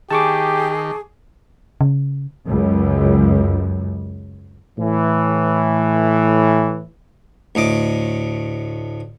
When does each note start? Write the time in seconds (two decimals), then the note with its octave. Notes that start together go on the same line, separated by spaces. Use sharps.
0.11 D#3 G4 G#4 A5 C#6 D6
1.81 C#3
2.46 C#2 F#2
4.79 A2 E3
7.55 D2 A2 D#5 D6